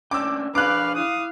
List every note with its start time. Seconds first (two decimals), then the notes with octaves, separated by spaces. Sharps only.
0.11 C#4 D4 G5 D6 E6
0.55 D4 G#4 B4 F5 D6 F#6
0.95 E4 F5 D#6